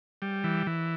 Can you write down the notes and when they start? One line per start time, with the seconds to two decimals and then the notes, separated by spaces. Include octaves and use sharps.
0.22 G3
0.44 E3
0.67 E3